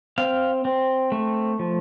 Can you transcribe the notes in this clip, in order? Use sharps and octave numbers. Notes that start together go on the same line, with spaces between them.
C4 F5
C4
A3
F3